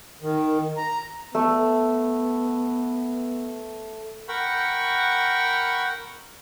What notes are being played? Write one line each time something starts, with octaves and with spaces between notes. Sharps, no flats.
D#3
A#5
A3 B3
A#4 F#5 G5 B5 C#6